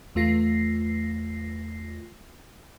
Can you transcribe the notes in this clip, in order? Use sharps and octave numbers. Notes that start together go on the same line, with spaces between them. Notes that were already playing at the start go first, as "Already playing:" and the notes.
E2 A3 F4 A#6 C7